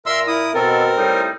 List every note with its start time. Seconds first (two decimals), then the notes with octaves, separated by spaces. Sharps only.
0.06 A#2 A#4 E5 C6 E6
0.27 E4 D#6
0.54 B2 C4 A4 A#4
0.98 A2 G3 D#4